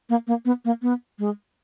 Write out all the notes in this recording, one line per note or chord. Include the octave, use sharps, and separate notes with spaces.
A#3
A#3
B3
A#3
B3
G#3